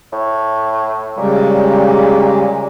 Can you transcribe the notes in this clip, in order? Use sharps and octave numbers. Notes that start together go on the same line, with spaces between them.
A2
A#2 C#3 G3 G#3